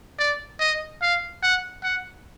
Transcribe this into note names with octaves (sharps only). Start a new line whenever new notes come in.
D5
D#5
F5
F#5
F#5